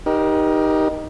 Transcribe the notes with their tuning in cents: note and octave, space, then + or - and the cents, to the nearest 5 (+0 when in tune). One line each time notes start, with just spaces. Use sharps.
D#4 +0 G4 +0 A#4 +30